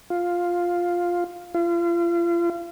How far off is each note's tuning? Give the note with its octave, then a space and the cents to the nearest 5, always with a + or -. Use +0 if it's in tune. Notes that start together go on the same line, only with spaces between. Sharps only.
F4 +5
F4 -35